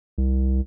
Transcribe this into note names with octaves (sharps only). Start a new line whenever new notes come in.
C2